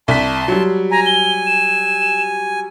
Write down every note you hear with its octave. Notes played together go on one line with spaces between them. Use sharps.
C2 A5 C6 B6
F#3 G3
G#5 A#5
G7
E7